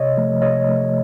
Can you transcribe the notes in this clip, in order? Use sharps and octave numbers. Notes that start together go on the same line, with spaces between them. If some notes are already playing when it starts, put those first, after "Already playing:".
Already playing: C3 C#5 D#5
F3 A3
C3 C#5 D#5
F3 A3